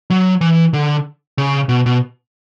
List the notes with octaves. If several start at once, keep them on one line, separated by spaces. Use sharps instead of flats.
F#3
E3
D3
C#3
B2
B2